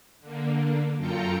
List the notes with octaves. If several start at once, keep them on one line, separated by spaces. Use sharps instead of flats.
D3 A#3
F#2 F4 A4 G5 A#5 C#7